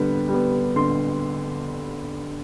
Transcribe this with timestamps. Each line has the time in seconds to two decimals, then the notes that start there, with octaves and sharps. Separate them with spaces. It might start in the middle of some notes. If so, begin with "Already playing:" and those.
Already playing: D3 G3 B3
0.28 G3
0.34 B3
0.76 D3 C6